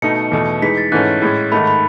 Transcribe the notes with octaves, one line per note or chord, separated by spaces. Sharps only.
B2 A3 D#4 C#7
E2 B2 A3
E3 G#3 D#4 B6
A6
G#2 E3 A3 C#4 F#6
A2 G#3 C#4
G#2 D#3 A3 B5
B5